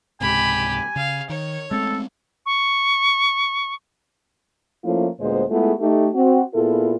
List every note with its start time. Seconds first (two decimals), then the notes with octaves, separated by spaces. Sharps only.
0.21 C#2 G#2 C3 G4 G#5 B5
0.96 C#3 F5
1.30 D#3 C#5
1.71 G#3 A3 C4 A4
2.46 C#6
4.85 F3 A3 A#3 C#4 E4 F4
5.20 D2 A#2 G#3 B3 C5
5.50 G#3 A3 B3 E4 F4 G#4
5.80 A3 D#4 G4
6.15 C4 F#4
6.55 A#2 B3 E4 F4 G#4 A4